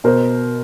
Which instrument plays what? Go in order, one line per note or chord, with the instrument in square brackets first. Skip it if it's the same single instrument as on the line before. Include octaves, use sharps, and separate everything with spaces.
[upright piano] B2 A#4 C5